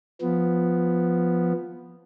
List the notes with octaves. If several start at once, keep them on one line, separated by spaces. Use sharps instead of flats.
F3 B3